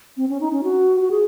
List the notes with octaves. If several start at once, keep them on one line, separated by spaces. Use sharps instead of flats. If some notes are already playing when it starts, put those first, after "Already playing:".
C4
C#4
D#4
C#4
F#4
F#4
G#4